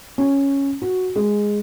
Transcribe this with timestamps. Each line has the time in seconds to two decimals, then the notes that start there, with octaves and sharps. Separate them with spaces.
0.18 C#4
0.82 F#4
1.16 G#3